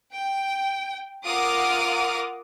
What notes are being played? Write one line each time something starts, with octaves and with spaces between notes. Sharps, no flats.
G5
F4 A#4 F#5 D6 D#6 F6